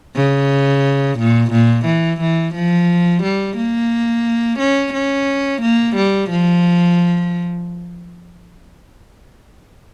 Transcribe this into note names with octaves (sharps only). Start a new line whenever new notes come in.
C#3
A#2
A#2
E3
E3
F3
G3
A#3
C#4
C#4
A#3
G3
F3